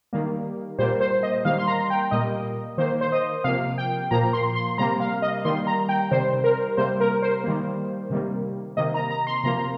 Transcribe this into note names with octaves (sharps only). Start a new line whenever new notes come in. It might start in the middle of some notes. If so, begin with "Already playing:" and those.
D#3 G3 A#3
A#2 G3 A#3 C5
C5
D#5
D#3 G3 A#3 F5
C6
A#5
G5
A#2 G3 A#3 D#5
D#3 A#3 C5
C5
D#5
C3 F3 A#3 F5
G5
A#2 F3 A#3 A#5
C6
C6
C3 G3 A#3 A#5
F5
D#5
D#3 G3 A#3 C6
A#5
G5
C3 D#3 G3 C5
A#4
C3 G3 A#3 C5
A#4
C5
D#3 G3 A#3
C3 D#3 G3 A#3
C3 D#3 A#3 D#5
A#5
A#5
C6
C3 F3 A#3 A#5